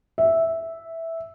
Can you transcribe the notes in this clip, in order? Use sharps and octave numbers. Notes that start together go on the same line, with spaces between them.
E5